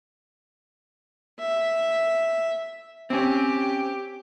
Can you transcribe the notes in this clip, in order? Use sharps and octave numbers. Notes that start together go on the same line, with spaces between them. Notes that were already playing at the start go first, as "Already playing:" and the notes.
E5
C4 C#4 G4